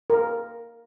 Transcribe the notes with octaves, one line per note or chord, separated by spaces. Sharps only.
A#4